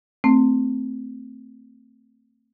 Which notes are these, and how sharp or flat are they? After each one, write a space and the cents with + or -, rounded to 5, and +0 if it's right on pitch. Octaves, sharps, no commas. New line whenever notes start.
A3 +25 C4 +0